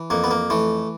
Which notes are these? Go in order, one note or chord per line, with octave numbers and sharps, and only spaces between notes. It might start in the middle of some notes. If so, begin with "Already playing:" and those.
Already playing: E3
F2 A#3
B3
A#3
E3 A3